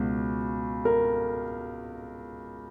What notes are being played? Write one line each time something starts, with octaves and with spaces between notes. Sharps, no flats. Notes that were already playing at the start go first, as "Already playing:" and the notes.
Already playing: C#2 B2
A#4